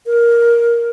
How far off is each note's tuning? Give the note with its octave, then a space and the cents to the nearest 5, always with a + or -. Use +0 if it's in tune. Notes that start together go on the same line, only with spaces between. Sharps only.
A#4 +10